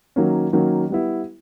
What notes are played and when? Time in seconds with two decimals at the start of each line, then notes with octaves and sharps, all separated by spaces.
0.16 D#3 F#3 A#3 C#4
0.53 D#3 F#3 A#3 C#4
0.90 G3 B3 E4